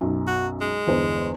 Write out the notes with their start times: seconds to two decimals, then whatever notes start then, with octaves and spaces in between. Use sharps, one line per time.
0.01 B1 F#2
0.27 F#4
0.61 G#3
0.87 G1 E2 C5